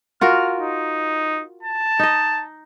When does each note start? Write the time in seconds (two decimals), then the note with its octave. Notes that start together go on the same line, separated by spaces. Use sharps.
0.21 F4 F#4 A#4 F6
0.58 D#4
1.62 A5
1.99 D#4 D#5